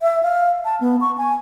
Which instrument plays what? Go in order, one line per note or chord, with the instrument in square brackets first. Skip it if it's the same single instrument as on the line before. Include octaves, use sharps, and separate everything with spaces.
[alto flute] E5
F5
A5
B3
C#6
G#5